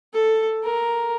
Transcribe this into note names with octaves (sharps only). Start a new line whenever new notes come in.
A4
A#4